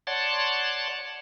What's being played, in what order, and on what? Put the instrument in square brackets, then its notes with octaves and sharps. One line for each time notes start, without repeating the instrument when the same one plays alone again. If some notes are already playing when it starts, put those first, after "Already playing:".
[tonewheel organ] C#5 D5 F#5 A5 C6